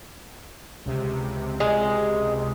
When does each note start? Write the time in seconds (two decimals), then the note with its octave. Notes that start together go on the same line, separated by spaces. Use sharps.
0.85 C#2 C3
1.60 G#3